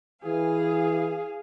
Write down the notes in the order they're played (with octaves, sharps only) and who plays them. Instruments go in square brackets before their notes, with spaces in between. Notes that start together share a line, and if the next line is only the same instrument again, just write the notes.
[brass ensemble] E3 [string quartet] G#4 F5 G#5